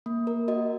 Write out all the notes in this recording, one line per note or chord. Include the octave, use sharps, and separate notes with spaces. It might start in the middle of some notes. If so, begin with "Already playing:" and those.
A#3
A#4
F#4 D#5